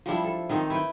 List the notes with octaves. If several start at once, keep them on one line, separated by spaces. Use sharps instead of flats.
F3 G3 D4 E4
A4
D#3 C4 D#4
E4 B4 G5